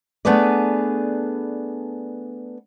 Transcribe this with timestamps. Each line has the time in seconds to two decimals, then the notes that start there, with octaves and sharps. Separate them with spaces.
0.25 A3 B3 D4 G#4 B4 D5